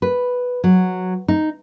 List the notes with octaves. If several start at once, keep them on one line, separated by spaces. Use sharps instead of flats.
B4
F#3
D#4